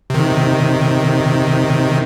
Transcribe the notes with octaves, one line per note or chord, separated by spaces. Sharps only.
C3 D#3